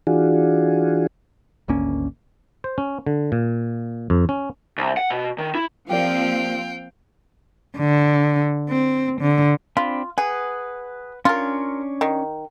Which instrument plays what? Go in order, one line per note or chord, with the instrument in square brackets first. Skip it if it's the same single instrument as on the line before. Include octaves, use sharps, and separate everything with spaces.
[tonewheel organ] E3 D4 F4 F#4 G#4
[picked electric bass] G#1 D2 A#3 C#4
[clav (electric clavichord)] C5
C#4
D3
A#2
F2
C#4
[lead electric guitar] C2
F#5
B2
D#3
E4
[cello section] F3 A#3 C4 [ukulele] G4 A#4 D5 [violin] F5 G5
[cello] D3
C4
D3
[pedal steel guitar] C4 D4 B5 [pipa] F4
[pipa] G#4 [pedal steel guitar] B4 F#5
[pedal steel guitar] C#4 D4 C#5 [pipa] F4 A#4
[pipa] D#3